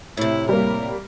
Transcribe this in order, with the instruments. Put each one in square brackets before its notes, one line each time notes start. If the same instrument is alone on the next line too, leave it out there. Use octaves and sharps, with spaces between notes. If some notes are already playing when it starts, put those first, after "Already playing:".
[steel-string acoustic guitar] A2 C3 [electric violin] E4
[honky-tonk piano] G3 A#3 [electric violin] A#4